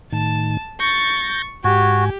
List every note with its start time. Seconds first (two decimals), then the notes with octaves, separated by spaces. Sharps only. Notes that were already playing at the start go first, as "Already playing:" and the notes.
0.13 A2 D#3 A5
0.80 C#6 G6 A6 A#6
1.64 G#2 F#4 G4 G#5